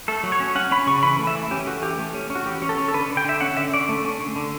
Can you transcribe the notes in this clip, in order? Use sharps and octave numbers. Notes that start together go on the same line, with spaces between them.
A3 A4
F#3
C#5
C#4
C#4 F#5
C#4 B5
C#3 C#6
E3 B5
A3
E5
E3
C#4 G4
A3 F#4
E3 G4
A3
C#4
C#4
F#4
E3 G4
C#4
A4
C#4
A4
D3 B4
D3
G5
D3 E5
C#4 F#5
D3 E5
D3 D5
A3
C#4
D3
D3